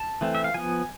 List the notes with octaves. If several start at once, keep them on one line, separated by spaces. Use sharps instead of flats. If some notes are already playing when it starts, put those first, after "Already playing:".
Already playing: A5
E3 A3 C4
E5
F5
F3 B3 G#5